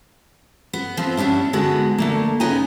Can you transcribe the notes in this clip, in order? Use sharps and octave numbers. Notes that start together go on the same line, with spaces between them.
B3
F3 B3 C4
G3 B3 C#4 D4 E4
D3 G#3 B3 F#4
D3 A3 A#3
C#3 B3 D#4 B4 G#5 A#5